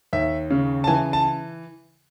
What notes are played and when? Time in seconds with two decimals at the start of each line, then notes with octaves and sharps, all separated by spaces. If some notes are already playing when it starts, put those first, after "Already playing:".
0.13 D#2 E5
0.51 C#3
0.84 A5
0.87 E3 G#5
1.13 A5